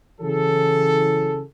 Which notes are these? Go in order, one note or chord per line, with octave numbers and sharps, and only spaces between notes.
C#3 E3 F#3 E4 G#4 A4